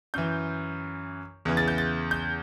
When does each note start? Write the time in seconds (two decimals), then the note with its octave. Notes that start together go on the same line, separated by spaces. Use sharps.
0.14 F#2 E3 G6
1.45 E2 C#3 E3
1.57 A6
1.68 G6
1.78 A6
2.11 G6